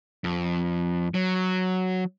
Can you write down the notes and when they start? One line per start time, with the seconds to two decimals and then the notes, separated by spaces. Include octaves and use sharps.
0.24 F2
1.14 F#3